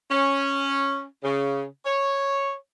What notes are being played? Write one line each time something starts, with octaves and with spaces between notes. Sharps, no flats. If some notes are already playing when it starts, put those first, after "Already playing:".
C#4
C#3
C#5